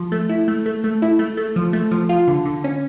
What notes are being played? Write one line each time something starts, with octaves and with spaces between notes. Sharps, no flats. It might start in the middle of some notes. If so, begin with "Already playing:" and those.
Already playing: F3
A3
E4
A3
A3
A3
E4
A3
A3
F3
A3
F3
F4
D3
D3
C#4